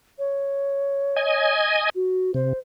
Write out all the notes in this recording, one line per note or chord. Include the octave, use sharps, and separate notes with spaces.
C#5
D#5 G#5
F#4
C3 C5